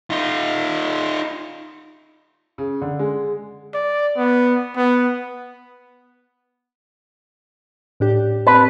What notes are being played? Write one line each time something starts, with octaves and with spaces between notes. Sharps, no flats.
D#4 F4
C#3
D3
G#3
D5
B3
B3
A2 D4 G4
C4 B4 A5